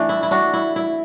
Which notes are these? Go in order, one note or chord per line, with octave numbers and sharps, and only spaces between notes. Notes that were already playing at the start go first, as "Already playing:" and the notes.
Already playing: E3 A3 D4
E4
E4
D4 F#4
E4
E4